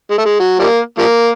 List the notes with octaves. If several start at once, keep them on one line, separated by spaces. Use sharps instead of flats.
G#3
A3
G#3
F#3
F3 G3 A#3
F3 G3 A#3